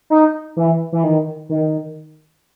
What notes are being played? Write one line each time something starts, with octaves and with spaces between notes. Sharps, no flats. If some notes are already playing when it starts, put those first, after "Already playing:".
D#4
E3
E3
D#3
D#3